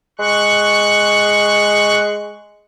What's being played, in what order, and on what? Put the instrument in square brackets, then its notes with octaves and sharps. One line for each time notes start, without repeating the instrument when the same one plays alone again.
[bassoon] G#3 [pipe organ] C#6 F#6